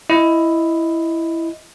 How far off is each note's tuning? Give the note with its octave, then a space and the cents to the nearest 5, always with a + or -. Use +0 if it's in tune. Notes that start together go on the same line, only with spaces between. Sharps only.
E4 +5 D#5 +10